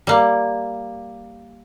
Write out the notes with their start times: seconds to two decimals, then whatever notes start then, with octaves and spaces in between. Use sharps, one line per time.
0.07 G3 A#3